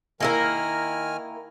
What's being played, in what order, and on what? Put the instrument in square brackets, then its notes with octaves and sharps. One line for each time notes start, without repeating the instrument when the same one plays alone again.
[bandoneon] D#3 G#5 F6 [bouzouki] A#3 E4 A#4